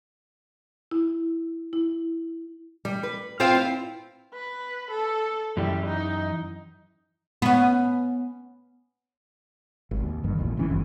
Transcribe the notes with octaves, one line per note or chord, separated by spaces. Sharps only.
E4
E4
G3
B4
C4 F4 C5 F5 G5
E4
B4
A4
F#2 E3 G3
D#4
B3 C#4
G#1
D#2
G1 G2 D#3
E1 A1 D#2 A#2
F1 D#3 E3 C#4
G1 G2